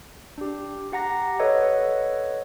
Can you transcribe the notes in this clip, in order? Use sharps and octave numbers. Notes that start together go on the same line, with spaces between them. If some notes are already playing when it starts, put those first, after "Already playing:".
D4 G4
G4 F#5 A#5 A#6
A4 B4 C#5 D#5 E5 F#5